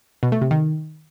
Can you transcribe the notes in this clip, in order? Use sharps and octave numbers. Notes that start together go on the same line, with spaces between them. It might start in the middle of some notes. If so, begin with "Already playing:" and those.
B2
A3
C3
D#3